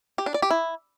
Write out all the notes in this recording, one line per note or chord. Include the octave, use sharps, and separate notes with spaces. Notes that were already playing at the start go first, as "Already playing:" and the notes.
G4
D4
D5
G4
E4